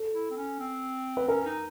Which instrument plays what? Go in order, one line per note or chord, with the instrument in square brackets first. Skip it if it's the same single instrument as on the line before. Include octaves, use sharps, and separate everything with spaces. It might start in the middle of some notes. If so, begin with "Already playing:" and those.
Already playing: [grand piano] A4
[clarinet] E4
C4
C#4
C4
[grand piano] B4
[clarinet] C#4 [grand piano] A#4
[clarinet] D#4